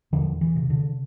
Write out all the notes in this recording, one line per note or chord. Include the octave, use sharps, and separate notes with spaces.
E2 D3 F3
E3
C3
D3